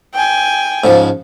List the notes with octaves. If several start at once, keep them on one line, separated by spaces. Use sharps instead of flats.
G5 G#5
G#2 C#3 F3